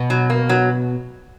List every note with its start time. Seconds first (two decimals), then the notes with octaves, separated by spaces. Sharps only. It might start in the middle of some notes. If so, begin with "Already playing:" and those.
Already playing: B2
0.10 F#3
0.30 A#3
0.49 F#3